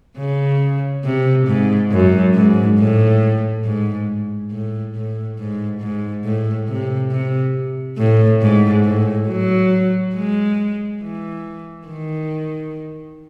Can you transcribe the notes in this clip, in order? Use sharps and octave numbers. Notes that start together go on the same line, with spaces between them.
C#3
C3
G#2
F#2
G#2
A2
G#2
A2
A2
G#2
G#2
A2
C3
C3
A2
G#2
A2
F#3
G#3
E3
D#3